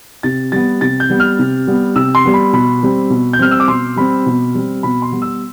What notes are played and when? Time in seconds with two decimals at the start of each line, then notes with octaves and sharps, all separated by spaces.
0.23 C3 A6
0.52 G3 B3 A6
0.81 C3 A6
1.00 G6
1.10 G3 B3
1.20 F6
1.39 C3
1.67 G3 B3
1.96 C3 E6
2.15 C6
2.25 G3 B3
2.34 B5
2.53 B2 B5
2.83 G3 C4
3.10 B2
3.33 G6
3.39 G3 C4 F6
3.51 E6
3.60 D6
3.68 B2 C6
3.96 G3 C4 B5
4.26 B2
4.54 G3 C4
4.83 B2 B5
5.02 C6
5.12 G3 B3
5.22 E6